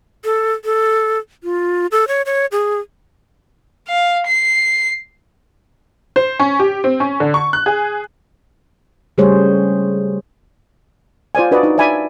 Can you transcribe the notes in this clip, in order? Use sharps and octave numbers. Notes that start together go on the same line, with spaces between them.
A4
A4
F4
A4
C#5
C#5
G#4
F5
C7
C5
C#4
G4
C4
C#4
D3
C#6
F#6
G#4
C#3 G3 A3 G#4 C5 C#5
F4 C5 D5 G#5
D4 F#4 B4 D5 D#5
D#4
D5 E5 G#5 B5